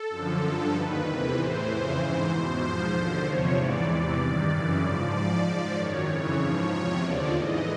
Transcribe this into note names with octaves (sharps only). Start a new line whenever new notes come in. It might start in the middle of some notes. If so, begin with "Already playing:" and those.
Already playing: A4
F#2 D3 F3
G2 D3 F3
D#2 D#3 B4
E2 C3 E3
A2 E3 C5
F2 C#3 E3
G#2 E3 C5
E2 B2 C5
G#2 F3 C5
D#2 D3 F3
E2 C3 F3 C#5
G#2 E3 D5
E2 C3 E3 D5
G2 D#3
F#2 C#3 E3
G#2 F3
G#2 F3 D5
G#2 F3
F#2 D#3 C#5
F2 C#3 E3
G#2 F3
E2 C3 F3 C#5
D#2 D3 F3 D5
G#2 E3 D#5